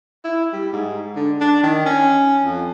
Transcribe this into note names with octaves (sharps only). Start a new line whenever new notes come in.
E4
G3
G#2
D3
D4
D#3
C#4
F2